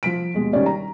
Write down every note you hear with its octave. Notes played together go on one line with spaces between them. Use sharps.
F3 B6 D7
D#2 B2 G#3
D#3 G3 C#4 D5
A#5